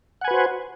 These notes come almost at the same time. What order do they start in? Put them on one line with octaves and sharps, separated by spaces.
F#5 G#5 B4 F#4 C5